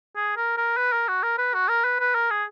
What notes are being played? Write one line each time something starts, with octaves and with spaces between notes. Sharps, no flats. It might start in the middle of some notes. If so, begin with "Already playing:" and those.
G#4
A#4
A#4
B4
A#4
F#4
A#4
B4
F#4
A#4
B4
B4
A#4
G#4